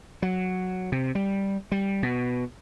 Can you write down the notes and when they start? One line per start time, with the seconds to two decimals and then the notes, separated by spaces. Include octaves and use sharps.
0.22 F#3
0.92 C3
1.15 G3
1.72 G3
2.03 B2